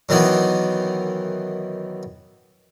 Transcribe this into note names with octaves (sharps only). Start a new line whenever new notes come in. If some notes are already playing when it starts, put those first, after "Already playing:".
F#2 D#3 E3 B3